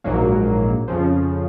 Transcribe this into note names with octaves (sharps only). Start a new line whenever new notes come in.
A#1 G#2 F#3 A#3
F2 C#3 F3